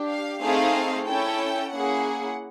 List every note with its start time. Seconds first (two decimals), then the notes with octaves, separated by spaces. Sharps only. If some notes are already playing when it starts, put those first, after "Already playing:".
Already playing: D4 G4
0.10 F5
0.41 A3 C4 D#4 G#4 F5
1.07 C#4 E4 A4 G5
1.72 A#3 C#4 E4 G#4 F#5